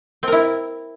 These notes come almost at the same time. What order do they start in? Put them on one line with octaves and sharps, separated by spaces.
C4 A#4 E4